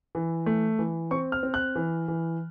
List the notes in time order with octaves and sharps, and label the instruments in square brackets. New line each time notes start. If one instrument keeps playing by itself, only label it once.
[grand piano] E3
A3
E3
C4 C#6
F6
C4
F#6
E3
E3